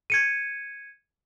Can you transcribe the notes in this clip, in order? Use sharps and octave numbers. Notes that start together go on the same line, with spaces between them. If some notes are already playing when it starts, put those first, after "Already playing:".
G#6 C#7 D#7